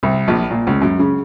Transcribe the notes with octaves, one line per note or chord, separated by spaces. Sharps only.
C2
A#1
A#2
C#2
F#2
C#3